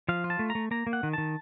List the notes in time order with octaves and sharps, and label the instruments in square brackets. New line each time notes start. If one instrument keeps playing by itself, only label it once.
[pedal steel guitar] F3 F5
F4
A5
A3
A#5
A3
A#3 A#5
A#3
F#5
D#3
D#3 A5